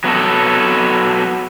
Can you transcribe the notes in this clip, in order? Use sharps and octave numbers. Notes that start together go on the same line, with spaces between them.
F#3 B3 F#4 A4